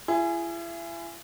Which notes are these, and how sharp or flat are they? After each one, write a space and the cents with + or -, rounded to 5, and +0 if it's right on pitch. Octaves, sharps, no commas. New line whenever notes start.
E4 +40 G#4 +0